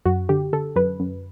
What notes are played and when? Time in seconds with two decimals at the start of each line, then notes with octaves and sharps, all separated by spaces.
0.06 F#2 F#4
0.29 D3 G4
0.53 D3 A4
0.76 F#2 B4
1.00 F#2